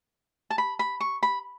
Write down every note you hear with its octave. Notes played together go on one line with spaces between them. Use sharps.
A5
B5
B5
C#6
B5